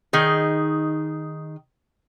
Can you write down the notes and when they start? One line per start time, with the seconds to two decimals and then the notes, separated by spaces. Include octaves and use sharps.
0.13 D#3 D#4 G#4